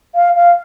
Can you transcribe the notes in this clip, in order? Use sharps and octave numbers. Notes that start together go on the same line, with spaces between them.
F5
F5